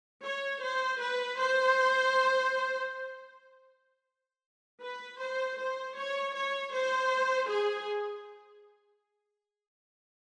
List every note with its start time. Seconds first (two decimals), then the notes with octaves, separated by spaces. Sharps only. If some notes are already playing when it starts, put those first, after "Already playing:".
0.24 C#5
0.62 C5
1.00 B4
1.38 C5
4.82 B4
5.20 C5
5.59 C5
5.97 C#5
6.35 C#5
6.74 C5
7.49 G#4